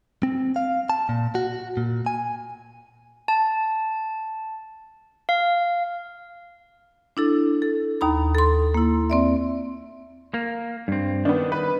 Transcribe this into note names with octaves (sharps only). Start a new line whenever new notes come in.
C4
F5
A5
A#2
F#4
A#2
G#5
A5
F5
D4 E4 A4
A4
D#2 D#4 A#5 B5
A4 C6
A#3 E4
C4 D5 E5
A#3
G2 C4
D#3 B3 D4
B4